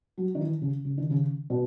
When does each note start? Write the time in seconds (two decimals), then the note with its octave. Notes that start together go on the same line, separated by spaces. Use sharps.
0.18 F#3
0.35 D#3
0.41 E3
0.62 C#3
0.85 C#3
0.98 D#3
1.10 C#3
1.50 B2